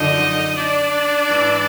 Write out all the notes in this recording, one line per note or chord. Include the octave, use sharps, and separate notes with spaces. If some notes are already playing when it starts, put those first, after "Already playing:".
Already playing: F#2 D3 F3 D#4 D#5
D4 D5
G#2 E3